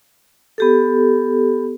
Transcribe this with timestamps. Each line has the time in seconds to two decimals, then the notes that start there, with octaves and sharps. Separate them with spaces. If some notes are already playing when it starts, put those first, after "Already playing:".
0.58 B3 G4 A4